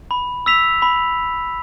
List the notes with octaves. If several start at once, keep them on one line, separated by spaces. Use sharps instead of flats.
B5
E6 B6 F7
B5